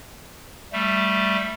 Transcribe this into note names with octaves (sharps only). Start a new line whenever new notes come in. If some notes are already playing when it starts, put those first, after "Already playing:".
G3 A3